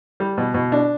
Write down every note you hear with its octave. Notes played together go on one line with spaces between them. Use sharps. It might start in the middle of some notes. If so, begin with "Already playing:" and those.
G3
B2
B2
D4